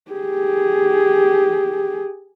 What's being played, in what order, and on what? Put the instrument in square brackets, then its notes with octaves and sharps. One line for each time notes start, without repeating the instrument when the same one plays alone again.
[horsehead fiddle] G4 G#4